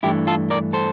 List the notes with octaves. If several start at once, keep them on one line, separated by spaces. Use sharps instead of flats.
G2 E3 A3 D4 E4 G4
F4 A4
A#4 D5
A4 C5